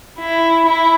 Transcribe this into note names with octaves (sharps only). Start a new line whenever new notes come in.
E4
E4